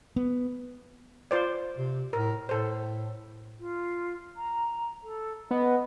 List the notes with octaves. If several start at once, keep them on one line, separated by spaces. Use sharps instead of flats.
B3
F4 C5 D5
C3
A2 A#4
A2 A4 C5
F4
A#5
A4
B3 D#5